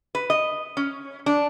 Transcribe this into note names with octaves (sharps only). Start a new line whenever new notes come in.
B4
D#5
C#4
D4